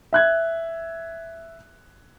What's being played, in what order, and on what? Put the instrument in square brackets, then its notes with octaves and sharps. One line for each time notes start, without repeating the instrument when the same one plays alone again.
[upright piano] E5 F#6 G#6